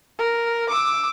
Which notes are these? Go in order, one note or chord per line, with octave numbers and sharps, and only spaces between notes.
A#4
D6 E6